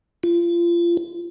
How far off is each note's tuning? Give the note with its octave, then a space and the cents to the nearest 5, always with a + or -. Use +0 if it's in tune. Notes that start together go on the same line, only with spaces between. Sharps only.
F4 -30